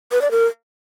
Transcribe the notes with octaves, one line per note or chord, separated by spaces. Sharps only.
B4
D5
A#4